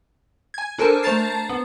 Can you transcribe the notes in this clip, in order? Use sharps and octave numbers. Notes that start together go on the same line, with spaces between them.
G#5 G#6
D4 A4 A#4 C5 G#5 A5
A3 C5 A5 A#5 A6 C7
B3